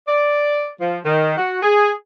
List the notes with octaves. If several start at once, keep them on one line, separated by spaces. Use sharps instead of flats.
D5
F3
D#3
F#4
G#4